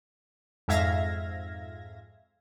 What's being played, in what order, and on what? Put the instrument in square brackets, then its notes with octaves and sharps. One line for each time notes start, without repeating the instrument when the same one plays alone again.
[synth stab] F2 G#2 E5 F5 G#6 A#6